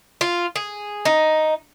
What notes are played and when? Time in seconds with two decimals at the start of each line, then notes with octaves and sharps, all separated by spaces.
0.21 F4
0.56 G#4
1.05 D#4